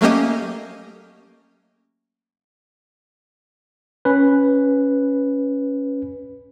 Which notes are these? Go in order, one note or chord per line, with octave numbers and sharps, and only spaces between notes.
F#3 A3 A#3 C#4 G4 D#5
C#4 B4